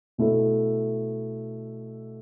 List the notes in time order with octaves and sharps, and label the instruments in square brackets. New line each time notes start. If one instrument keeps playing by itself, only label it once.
[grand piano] B2 A3 E4 A4